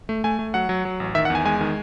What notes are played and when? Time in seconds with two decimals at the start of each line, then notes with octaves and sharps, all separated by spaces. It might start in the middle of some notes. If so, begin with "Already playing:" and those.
0.09 A3
0.24 A3 G#5
0.39 A3
0.54 F#3 F#5
0.69 F#3
0.85 F#3
1.00 A1
1.15 D#3 E5
1.25 F#5
1.30 E2
1.35 G#5
1.45 G#3 G#5
1.61 D#3